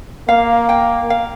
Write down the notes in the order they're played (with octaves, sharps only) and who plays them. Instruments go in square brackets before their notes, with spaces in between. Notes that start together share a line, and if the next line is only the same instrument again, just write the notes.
[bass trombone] A#3 [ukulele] F5
[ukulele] G5
F5